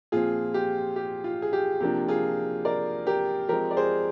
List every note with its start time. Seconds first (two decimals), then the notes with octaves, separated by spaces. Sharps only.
0.12 A#2 F3 C4 F4 G#4
0.54 G4
0.96 G4
1.24 F4
1.42 G#4
1.53 G4
1.81 C3 F3 A#3 D4 G4
2.08 F4 G#4
2.65 A#4 D5
3.07 G4 A#4
3.49 F3 G#3 C4 G4 A#4
3.71 D5
3.77 G#4 C5